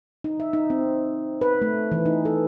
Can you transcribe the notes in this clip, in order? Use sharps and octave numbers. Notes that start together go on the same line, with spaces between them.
D#4
E5
D#4
C4
B4
A3
E3
D#4
A4